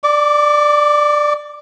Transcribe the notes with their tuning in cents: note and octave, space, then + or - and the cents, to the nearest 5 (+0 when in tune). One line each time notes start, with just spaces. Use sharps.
D5 +10 D6 -25